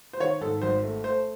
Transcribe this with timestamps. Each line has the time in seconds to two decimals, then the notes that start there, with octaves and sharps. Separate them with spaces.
0.13 C5
0.20 D#3 C#5
0.41 G#2 A4
0.62 G#1 C5
0.83 A3
1.04 A3 C5